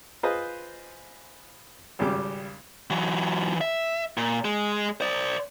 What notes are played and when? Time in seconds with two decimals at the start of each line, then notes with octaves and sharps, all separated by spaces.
0.23 F4 G#4 B4 C5 D#5
1.99 G#1 C#3 G3 D6
2.90 E3 F#3
3.61 E5
4.17 A#2
4.45 G#3
5.01 C5 D5